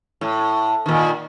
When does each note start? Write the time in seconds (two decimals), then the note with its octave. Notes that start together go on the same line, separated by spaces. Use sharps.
0.21 A2
0.86 A#2 D#3